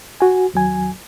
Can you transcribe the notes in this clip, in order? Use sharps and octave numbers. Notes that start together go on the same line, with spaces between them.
F#4 G#5
D#2 F#3 G#5